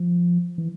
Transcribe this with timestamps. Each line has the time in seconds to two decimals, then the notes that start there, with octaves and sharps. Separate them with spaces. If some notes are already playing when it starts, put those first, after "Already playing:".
Already playing: F3
0.58 E3